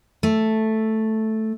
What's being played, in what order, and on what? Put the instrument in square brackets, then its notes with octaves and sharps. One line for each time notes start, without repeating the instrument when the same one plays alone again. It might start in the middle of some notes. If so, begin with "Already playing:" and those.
[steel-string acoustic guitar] A3